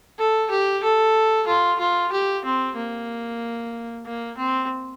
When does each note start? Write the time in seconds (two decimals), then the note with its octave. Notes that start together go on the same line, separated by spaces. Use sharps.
0.19 A4
0.50 G4
0.83 A4
1.47 F4
1.80 F4
2.12 G4
2.45 C4
2.76 A#3
4.06 A#3
4.38 C4